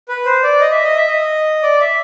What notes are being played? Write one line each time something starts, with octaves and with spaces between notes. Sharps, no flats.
B4
C5
D5
D#5
E5
D#5
E5
D#5
D5
E5